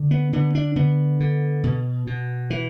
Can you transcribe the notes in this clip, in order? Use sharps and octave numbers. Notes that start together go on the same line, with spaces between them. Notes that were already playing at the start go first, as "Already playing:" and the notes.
Already playing: D3
B3
D3 B3
D4
D3 B3
D3
B2
B2
E3